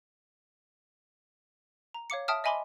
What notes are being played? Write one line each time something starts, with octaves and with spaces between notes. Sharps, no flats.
A#5
C#5 F5 D6 C#7
E5 G5 A5 D#6 F6
D#5 E5 G#5 B5 C6 D6